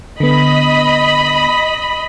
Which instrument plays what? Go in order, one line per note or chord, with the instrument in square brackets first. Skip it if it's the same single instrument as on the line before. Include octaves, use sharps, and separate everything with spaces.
[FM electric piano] D3 B3 [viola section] D#5 B5